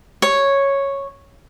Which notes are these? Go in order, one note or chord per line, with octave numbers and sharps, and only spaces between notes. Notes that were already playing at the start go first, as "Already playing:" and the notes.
C#5